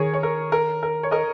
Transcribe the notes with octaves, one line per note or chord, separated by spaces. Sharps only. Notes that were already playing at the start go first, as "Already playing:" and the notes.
Already playing: D#3 G#4 A#4 C#5
C#5
A#4
A#4
A#4
C#5
A#4 D#5